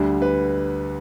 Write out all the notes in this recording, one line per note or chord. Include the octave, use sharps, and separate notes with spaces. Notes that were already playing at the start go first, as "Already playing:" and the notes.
Already playing: D2 D3 G3
B4